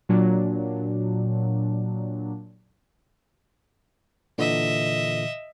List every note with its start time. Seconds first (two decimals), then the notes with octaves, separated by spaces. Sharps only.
0.09 A#2 F#3 D4
4.38 A#2 D3 E3 D#5 E5